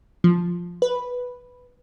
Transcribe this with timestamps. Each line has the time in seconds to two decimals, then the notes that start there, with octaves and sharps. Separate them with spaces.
0.24 F3
0.82 B4